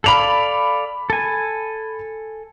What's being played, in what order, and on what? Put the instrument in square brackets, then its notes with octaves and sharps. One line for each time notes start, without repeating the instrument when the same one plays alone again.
[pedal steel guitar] A4 D5 F5 [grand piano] B5 F7 F#7
[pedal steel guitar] A4 G#5